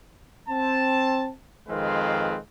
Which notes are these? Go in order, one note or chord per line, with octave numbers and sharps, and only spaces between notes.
C4 A5
F2 D#3 G#3 C4 B4 F5